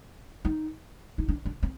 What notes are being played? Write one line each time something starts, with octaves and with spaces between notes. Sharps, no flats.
D#4
D#4
D4
D4
C4